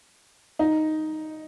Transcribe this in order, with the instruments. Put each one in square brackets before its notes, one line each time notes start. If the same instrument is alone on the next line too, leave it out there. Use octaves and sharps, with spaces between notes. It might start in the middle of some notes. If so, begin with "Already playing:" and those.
[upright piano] D#4